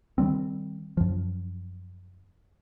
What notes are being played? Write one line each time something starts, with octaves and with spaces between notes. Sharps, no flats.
D#3 F#3 G3 C4
F#2 F3